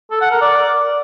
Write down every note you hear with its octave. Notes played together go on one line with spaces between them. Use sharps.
A4
F#5
A#4
D5